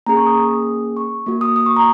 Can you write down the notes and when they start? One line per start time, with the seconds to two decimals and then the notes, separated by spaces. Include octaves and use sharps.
0.06 A#3 C#4 G#4 A#5
0.17 C#6
0.27 D#6
0.97 C#6
1.26 A#3 F#4
1.41 D#6
1.56 D#6
1.66 C#6
1.76 A#5